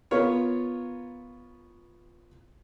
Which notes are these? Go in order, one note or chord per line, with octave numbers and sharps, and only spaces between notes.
B3 F4 A#4 C#5